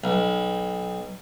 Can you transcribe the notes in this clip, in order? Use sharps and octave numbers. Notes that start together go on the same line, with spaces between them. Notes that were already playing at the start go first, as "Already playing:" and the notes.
B1